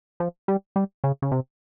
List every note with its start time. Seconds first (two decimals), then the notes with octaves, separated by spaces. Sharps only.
0.20 F3
0.48 G3
0.76 G3
1.04 C#3
1.22 C#3
1.32 C3